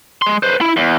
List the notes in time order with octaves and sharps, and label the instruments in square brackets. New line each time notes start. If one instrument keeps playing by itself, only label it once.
[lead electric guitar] G#3 C6
B4 C5
E4
E2